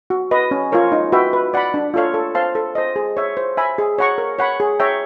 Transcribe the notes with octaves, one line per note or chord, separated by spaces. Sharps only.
F#4
B4 D#5
C#4
F4 A#4 C#5
D#4
F#4 B4 E5 G5
B4
D5 F#5 B5
D4
F4 A4 C#5 F5
A4
C5 F5 A5 C6
A4
C5 D#5
G#4
C#5 E5
C5
E5 G#5 B5
G#4
C#5 F#5 A#5 C#6
A#4
C#5 F#5 B5
G#4
C#5 E5 G5 A#5